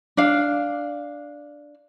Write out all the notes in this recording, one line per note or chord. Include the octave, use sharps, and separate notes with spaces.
D4 F5